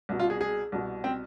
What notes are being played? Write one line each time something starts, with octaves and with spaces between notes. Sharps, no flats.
C2 B2
F4
G#4
G#4
C2 B2
C4